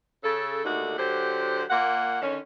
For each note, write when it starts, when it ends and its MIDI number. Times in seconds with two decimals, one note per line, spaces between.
0.23 0.63 49
0.23 0.63 69
0.64 0.97 39
0.64 0.97 50
0.64 0.97 57
0.64 0.97 63
0.64 0.97 66
0.97 1.63 50
0.97 1.63 54
0.97 1.63 67
0.97 1.63 72
1.69 2.20 46
1.69 2.20 58
1.69 2.20 78
2.21 2.38 50
2.21 2.38 51
2.21 2.38 61